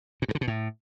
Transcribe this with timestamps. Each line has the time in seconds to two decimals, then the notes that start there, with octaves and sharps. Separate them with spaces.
0.22 A#2
0.28 G2
0.35 D3
0.41 B2
0.48 A2